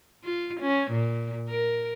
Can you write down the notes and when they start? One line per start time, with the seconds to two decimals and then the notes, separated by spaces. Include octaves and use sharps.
0.24 F4
0.61 C#4
0.91 A#2
1.49 A#4